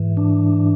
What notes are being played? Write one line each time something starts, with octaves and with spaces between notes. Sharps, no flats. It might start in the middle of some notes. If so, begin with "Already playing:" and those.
Already playing: G#2 E3
D4